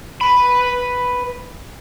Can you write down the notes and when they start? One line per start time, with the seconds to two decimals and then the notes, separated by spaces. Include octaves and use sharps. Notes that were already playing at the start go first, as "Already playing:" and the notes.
0.21 B4 B5